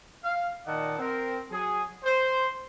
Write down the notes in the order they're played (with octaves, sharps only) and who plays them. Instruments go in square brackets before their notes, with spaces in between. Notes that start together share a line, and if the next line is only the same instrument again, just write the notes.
[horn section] F5
A#2 D#3 D5 D#5 F#5 A5
C4 A#4
F#3 G#4
C5